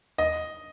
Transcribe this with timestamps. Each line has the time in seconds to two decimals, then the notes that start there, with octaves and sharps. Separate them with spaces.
0.18 D#5